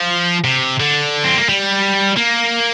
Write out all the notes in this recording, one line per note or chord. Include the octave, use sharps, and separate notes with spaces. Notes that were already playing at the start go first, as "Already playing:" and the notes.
Already playing: F3
C3
D3
C4
A#3
G3
A#3